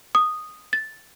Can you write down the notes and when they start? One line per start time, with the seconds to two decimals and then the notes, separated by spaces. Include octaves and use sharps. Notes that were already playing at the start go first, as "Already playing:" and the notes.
0.15 D#6
0.73 A6